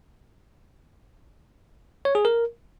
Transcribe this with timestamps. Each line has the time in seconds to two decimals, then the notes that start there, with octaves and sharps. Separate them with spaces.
2.05 C#5
2.15 G#4
2.25 A#4